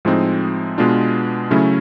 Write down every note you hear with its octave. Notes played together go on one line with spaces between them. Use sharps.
A2 F3 G#3 C4 D#4
B2 G#3 B3 D4 F4
C#3 F#3 A3 C#4 E4